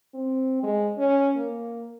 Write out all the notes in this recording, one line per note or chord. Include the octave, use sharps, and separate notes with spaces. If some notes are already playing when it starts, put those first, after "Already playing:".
C4
G#3
C#4
A#3